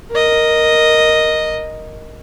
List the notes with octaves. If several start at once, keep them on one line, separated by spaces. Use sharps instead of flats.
A#4 D#5